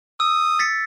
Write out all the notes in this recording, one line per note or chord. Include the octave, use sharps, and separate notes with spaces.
D#6 E6
A6 B6 C#7